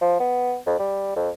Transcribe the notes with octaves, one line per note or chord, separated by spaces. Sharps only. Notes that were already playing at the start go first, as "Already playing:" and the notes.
F3
B3
F2
G3
F2